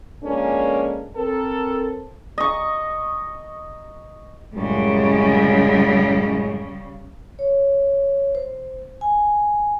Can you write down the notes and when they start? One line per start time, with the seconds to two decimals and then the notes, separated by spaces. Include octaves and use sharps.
0.23 F3 G#3 A#3 C#4 D4 A4
1.15 C4 A4 A#4
2.38 D#5 C#6
4.55 F#2 A2 C#3 G3 G#3
7.39 C#5
8.35 C5
9.01 G#5